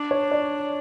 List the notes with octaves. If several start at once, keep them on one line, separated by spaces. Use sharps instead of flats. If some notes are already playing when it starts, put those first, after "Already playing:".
Already playing: D4
C#5
D5